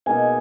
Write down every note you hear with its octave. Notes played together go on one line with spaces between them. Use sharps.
B2 A#3 D#4 G#5